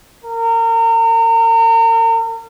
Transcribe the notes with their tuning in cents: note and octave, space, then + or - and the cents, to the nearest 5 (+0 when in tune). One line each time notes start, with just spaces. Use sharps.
A#4 -35